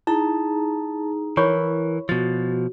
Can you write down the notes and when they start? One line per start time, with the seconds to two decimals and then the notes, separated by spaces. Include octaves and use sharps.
0.07 D#4 E4 G#4 A5 A#5
1.37 E3 E4 A#4 C#5 B5 C#6
2.09 B2 F3 F#4 A6